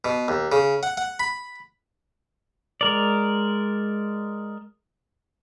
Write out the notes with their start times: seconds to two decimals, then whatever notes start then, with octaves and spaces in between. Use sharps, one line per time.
0.05 B2
0.28 D#2
0.52 C#3
0.83 F#5
0.97 F#5
1.20 B5
2.81 G#3 A#4 D5